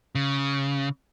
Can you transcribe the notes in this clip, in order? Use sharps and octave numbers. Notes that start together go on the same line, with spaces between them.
C#3